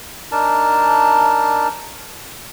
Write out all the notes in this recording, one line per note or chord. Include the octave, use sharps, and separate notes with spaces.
D4 D#4 A#4 A5